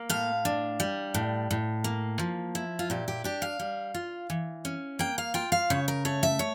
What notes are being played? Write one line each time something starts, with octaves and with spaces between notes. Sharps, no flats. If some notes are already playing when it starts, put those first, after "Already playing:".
Already playing: A#3
A2 F5
D4
G3
A2
A2
A#3
F3
E4
F4
A#2 G4
G4
D4 G4
F5
G3
F4
E3
C#4
A#3 G5
F5
F4 G5
F5
C#3 C#5
A#4
A3 C#5
E5
C#5